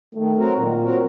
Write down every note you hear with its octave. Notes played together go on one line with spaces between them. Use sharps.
D#3 A3
F#3 C4 F#4 A#4
A#2 D#3
F#3 C4 F#4 A#4